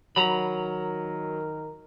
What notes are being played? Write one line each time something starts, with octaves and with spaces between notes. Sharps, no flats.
D#3 F#3 A#4 A#5 B5